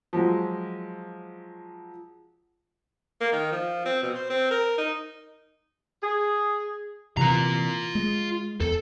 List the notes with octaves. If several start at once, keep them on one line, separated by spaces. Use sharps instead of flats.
F3 F#3 G#3
A#3
D#3
F3
C4
B2
C5
C4
A#4
D#4
G#4
C3 E3 F4 A#5
G#3
E2 A4